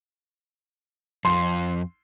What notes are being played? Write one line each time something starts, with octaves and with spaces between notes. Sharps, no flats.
F2 C6